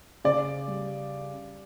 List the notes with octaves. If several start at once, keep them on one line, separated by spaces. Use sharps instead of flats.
C#3 D5
G3